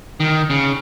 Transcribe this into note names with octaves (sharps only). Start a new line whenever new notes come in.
D#3
C#3